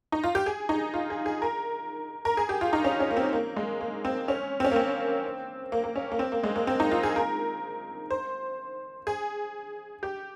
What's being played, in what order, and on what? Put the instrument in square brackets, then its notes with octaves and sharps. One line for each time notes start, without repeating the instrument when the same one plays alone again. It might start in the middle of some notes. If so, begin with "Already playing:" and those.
[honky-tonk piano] D#4
F4
G4
G#4
D#4
F4
G#4
G#4
A#4
A#4
G#4
G4
F4
D#4
C#4
C#4
A#3
C4
A#3
G#3
A#3
C4
C#4
C4
C#4
A#3
C4
A#3
A#3
C#4
A#3
C4
A#3
G#3
A#3
C4
D#4
F4
G#4
A#4
C5
G#4
G4